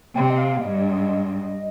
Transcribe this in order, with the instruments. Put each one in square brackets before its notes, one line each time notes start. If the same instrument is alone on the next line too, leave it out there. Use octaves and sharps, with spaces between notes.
[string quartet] C3 [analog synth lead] G5
[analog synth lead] D#5
F5
[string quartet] G2 [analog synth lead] D#5